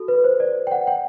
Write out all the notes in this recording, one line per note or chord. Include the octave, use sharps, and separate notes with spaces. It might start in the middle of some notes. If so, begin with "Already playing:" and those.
Already playing: F#4 A4
B4
C5
D5
G5
F#5
G5